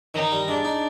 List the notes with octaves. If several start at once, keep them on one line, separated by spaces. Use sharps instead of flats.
D#3 D#4
G3
G#3 D4
D#4